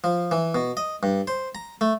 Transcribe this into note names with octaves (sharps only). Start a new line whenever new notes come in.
F3
E3
B2
D#5
G2
C5
A#5
A3